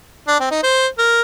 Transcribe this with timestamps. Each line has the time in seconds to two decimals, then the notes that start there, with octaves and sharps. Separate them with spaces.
0.28 D4
0.40 C4
0.51 D#4
0.63 C5
0.98 A#4